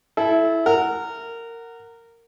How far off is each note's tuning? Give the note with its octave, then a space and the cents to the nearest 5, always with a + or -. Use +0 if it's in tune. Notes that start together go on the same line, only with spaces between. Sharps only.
E4 +0 A4 -25
A#4 -15 F#5 +0